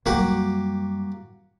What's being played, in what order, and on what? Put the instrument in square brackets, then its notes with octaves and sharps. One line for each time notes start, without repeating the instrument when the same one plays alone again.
[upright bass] F#2 G3 [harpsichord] A#3 F#4 G4